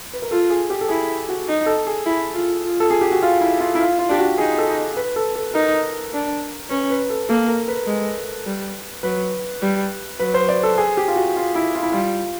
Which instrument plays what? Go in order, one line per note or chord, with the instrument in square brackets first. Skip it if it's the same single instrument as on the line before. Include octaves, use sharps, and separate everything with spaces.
[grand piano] B4
A#4
[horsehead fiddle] F4 [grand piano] A4
[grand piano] G#4
G4
A4
[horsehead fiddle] E4 [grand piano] G#4
[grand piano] F#4
[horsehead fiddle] D#4
[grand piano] A4
G#4
[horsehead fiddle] E4
F4
F4
[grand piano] A4
G#4
G4
F#4
F4
E4
F4
E4
F4
F4
[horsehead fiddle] D4 [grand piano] G4
[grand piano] F#4
[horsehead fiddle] D#4 [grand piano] G#4
[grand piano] A4
B4
A4
A4
[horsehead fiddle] D#4 [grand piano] A#4
[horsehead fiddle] D4
[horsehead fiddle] C#4 [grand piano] B4
[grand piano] B4
A4
[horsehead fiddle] A#3 [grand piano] A4
[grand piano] A#4
B4
[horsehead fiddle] G#3
G3
[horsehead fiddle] F#3 [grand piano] B4
[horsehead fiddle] G3
[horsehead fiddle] F#3 [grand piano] B4
[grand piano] C5
D5
A4
G#4
G4
F4
F#4
F4
E4
F4
E4
[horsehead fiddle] G3 [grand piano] F4